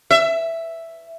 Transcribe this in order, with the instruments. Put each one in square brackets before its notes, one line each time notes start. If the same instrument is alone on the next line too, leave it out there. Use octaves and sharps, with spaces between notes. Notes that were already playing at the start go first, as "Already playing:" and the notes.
[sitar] E5